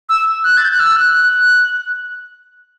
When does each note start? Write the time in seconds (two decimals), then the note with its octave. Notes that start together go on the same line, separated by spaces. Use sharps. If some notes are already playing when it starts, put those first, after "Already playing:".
0.09 E6
0.44 F#6
0.57 A6
0.65 G6
0.71 F#6
0.80 E6
0.96 F#6
1.14 F#6